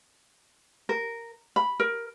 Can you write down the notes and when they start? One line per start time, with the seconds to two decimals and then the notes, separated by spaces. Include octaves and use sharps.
0.89 A#4
1.56 B5
1.80 A#4